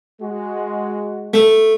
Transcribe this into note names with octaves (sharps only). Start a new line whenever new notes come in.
G#3 F#4
A3